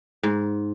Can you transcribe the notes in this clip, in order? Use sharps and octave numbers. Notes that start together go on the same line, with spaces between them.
G#2